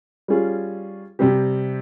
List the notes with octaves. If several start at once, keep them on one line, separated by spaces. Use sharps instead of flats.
G3 C#4 F4 G#4
C3 G3 C4 G4